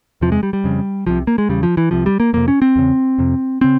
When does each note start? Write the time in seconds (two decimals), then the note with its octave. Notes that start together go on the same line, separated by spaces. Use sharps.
0.21 E2 C3 F3
0.32 G#3
0.43 G3
0.53 G3
0.64 F2 C#3
1.07 C2 C3 F3
1.27 A#3
1.38 G#3
1.49 E2 C#3 G3
1.63 F3
1.77 E3
1.91 C2 C3 F3
2.06 G3
2.20 A#3
2.33 F2 C3 A#3
2.48 C#4
2.62 C4
2.76 E2 C#3
3.18 F2 C3
3.61 C#3 C4